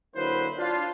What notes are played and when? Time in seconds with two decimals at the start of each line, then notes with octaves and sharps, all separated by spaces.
0.15 D3 F#3 A#3 E4 B4 C5
0.58 D4 F4